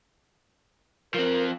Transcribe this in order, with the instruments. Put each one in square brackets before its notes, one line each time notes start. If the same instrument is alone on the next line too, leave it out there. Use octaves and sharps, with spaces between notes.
[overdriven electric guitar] F3 C4 [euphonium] A#4